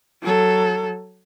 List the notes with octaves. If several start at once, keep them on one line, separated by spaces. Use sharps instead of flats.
F#3 A4